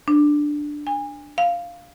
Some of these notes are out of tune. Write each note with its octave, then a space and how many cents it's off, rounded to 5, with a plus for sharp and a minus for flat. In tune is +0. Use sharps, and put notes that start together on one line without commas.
D4 +5
G#5 -30
F5 -5